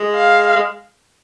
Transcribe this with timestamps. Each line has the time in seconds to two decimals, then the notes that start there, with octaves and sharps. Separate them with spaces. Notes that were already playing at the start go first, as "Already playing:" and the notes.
Already playing: G#3
0.15 F5
0.56 G#3